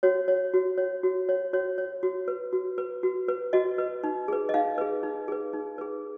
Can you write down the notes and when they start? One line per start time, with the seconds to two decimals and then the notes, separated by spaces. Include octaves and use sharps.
0.03 F#4 C#5
0.28 C#5
0.54 F#4
0.78 C#5
1.03 F#4
1.29 C#5
1.53 F#4 C#5
1.78 C#5
2.03 F#4
2.28 B4
2.53 F#4
2.78 B4
3.03 F#4
3.28 B4
3.53 F#4 D#5
3.78 B4
4.04 D#4
4.28 G#4 B4
4.49 D#5
4.54 D#4 F5
4.78 G#4 B4
5.03 D#4
5.28 G#4 B4
5.53 D#4
5.78 G#4 B4